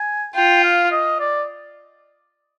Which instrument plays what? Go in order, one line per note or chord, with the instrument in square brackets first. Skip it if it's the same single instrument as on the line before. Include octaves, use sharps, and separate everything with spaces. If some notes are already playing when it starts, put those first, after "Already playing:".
Already playing: [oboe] G#5
[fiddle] F4 [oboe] G5
[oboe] F5
D#5
D5